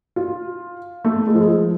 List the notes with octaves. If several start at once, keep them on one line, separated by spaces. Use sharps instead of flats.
F4
A3
G#3
F3
G#3
F3